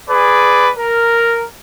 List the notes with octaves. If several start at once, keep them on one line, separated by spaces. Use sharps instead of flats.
G#4 B4 D5
A#4